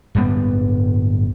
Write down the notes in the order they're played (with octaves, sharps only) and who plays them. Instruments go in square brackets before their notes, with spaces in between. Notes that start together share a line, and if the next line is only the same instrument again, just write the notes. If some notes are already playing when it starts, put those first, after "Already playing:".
[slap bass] D1 G2 G3 B3